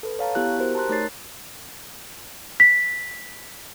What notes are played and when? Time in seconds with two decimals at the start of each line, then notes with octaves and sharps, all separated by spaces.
0.03 A4 B4
0.19 C#5 F5 A5 A#5
0.35 B3 E4 G4 F#6
0.59 F#4 G4 A#4 C5
0.75 A5 A#5 C6 F#6
0.89 A3 D#4 A#4 C#5 A6 C7
2.60 B6